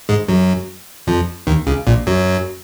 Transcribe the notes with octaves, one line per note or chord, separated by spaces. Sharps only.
G#2 G#3
F#2 F#3
F2 F3
D#2 D#3
C#2 C#3
A#1 A#2
F#2 F#3